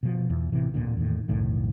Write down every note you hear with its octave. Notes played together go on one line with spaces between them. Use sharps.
B2 F3
E2
A1 C3 E3
D1 G#1 A#2 D3
E2 A2 D#3
F1 B1 A2 D#3